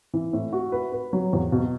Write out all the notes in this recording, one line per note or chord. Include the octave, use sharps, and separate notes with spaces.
E3
A2
F#4
B4
B4
F#3
E2
B2